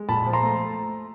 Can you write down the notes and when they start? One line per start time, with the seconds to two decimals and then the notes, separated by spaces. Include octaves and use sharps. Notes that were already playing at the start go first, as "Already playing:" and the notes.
Already playing: G#3
0.09 A#2 A5 B5
0.26 F3
0.33 A#5 C6
0.43 A3